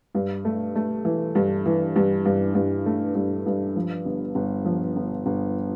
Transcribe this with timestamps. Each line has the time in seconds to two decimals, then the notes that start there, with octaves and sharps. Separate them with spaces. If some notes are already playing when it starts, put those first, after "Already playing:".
0.15 G2
0.45 A3
0.75 A3
1.05 E3
1.35 G2
1.66 E3
1.96 G2
2.25 G2
2.55 G2
2.86 A3
3.15 G2
3.46 G2
3.76 F3
4.05 G1
4.35 G1
4.65 F3
4.96 G1
5.26 G1